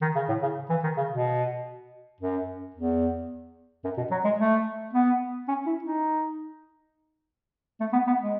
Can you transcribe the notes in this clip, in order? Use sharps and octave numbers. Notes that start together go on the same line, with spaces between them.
D#3
C#3
A2
C#3
E3
D#3
C#3
B2
F#2
E2
F#2
B2
F#3
G#3
A3
B3
C#4
E4
D#4
A3
B3
B3
G#3